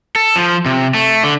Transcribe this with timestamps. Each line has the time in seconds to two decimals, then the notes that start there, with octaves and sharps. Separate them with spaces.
0.16 A4
0.36 F3
0.66 C3
0.94 A3
1.24 D3